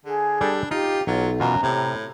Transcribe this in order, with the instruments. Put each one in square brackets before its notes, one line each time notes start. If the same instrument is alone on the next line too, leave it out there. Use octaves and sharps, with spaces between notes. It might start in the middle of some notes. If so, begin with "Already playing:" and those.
[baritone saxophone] D3 [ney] G#4
[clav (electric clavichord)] G3 G4 A4 [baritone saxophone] D4
[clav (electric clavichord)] D#4 [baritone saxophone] F4 [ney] G4
[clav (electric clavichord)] B1 [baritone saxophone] F#3 [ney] F4
[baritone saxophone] F#2 [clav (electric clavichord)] B2 E3 F4 [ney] A#5
[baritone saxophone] A2 [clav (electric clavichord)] C3